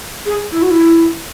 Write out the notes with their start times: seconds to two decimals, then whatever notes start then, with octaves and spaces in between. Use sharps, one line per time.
0.26 G#4
0.52 E4
0.62 F#4
0.71 E4